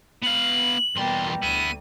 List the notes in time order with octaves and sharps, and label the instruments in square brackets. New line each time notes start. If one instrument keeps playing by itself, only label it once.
[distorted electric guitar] B3 F5 [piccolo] F#7
[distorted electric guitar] E2 C6 [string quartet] B2 G3 A#3
[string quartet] D2 [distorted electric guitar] B3 E4 [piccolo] D#7